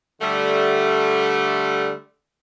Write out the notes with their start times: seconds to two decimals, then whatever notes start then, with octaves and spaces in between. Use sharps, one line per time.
0.21 D3 G3 A3